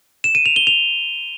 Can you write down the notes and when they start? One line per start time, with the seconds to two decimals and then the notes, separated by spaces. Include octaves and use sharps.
0.24 E7
0.35 D#7
0.46 F7
0.56 G7
0.67 F7